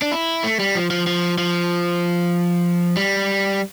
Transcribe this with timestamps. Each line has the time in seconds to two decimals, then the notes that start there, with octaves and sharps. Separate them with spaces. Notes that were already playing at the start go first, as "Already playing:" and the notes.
0.02 D4
0.12 E4
0.44 A3
0.60 G3
0.75 F3
0.91 F3
1.07 F3
1.38 F3
2.97 G3